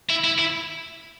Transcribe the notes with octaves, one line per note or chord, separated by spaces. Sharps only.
E4
E4
E4